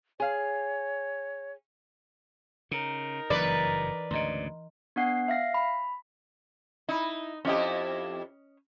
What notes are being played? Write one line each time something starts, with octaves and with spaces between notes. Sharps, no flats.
G#4 C#5 F5
C#3 D#4 A#4
F#1 G2 A#2 E3 B4 D5
D2 G#2 C#3 D#5 A#5 C6
B3 D4 F#5 C7
E5 F5 A#6 C7
B5
D#4 E4
F2 C#4 E4 G4 D#5